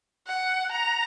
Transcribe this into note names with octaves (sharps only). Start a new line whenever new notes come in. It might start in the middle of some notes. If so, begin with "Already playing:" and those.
F#5
A#5